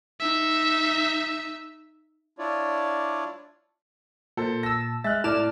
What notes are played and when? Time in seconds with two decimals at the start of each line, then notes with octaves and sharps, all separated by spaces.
0.20 D#4 E5
2.39 D4 E4 F4 C#5 D5
4.37 A#2 A4 C5
4.63 A5 E6 A#6
5.04 G#3 E5 F6 F#6 A6
5.24 A2 E4 D5 A5 D6 F6 E7